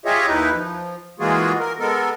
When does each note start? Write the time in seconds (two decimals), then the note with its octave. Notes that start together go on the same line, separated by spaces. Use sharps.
0.05 F4 G4 G#4 C#5 D#5 E5
0.27 D#2 D#4 E4 B4
0.53 F3
1.20 E3 G#3 A#3 F4 F#4 G#4
1.60 A#4
1.80 G#3 B3 A4 A#4